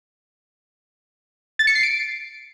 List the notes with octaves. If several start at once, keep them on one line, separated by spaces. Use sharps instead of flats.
A6
C#7
C7
D7